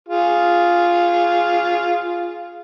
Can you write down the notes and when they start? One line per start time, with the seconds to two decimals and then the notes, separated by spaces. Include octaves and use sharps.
0.08 F4 G#4